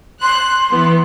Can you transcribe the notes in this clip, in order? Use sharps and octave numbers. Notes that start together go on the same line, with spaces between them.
C6 F#6
E3 B3